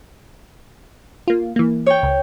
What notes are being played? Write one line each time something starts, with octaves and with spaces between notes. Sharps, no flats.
A#3 F4
E3 A#3
C#5 G5
C#2